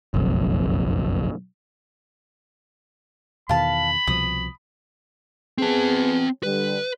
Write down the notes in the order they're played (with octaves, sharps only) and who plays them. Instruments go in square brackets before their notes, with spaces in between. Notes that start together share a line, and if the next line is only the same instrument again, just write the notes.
[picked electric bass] F#1 B1 F2
[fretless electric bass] E2 B2 D#3 [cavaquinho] F5 A5 [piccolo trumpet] B5
[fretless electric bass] C2 B2 F3 [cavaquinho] D#6
[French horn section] B3 G#4 [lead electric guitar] C4 A5
[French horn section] D3 G3 [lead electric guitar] B4